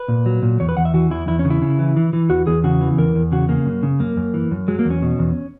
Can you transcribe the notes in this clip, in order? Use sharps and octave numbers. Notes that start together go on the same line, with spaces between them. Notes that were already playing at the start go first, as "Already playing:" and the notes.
Already playing: B4
A#2
F#3
A#2
E2 C#5
B4
E2 F#5
E5
E3 F#4
E2 E4
E2 E4
C#4
C#3
E4
C#3
E3
E3
E3
E2 F#4
E2 G#4
C#3 F#4
E3
E2 A#4
E2
C#3 F#4
C#3 A#3
F#2
C#3
F#2 A#3
F#2
E3
F#2
F#3 G#3
A#3
E2
C#4
B2
E2